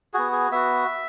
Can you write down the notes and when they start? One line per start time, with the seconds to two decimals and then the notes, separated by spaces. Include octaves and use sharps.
0.14 B3 F#4 G#4
0.32 G#4
0.51 B3 F#4 E5